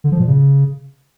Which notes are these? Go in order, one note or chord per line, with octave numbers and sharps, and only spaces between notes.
D3
F3
A#2
C#3